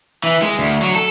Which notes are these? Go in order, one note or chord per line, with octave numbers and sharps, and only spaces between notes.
E3
G#3
D2
F#3
A4